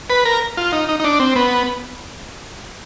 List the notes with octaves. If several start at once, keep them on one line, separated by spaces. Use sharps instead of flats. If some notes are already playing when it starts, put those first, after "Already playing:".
B4
A#4
F4
D#4
D#4
D#4
D4
C4
B3